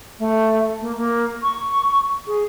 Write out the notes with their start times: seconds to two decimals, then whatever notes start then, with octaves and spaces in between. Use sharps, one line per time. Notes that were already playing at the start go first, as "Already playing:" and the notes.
0.19 A3
0.81 A#3
0.97 A#3
1.43 C#6
2.27 G#4